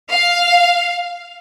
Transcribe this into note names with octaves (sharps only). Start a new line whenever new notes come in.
F5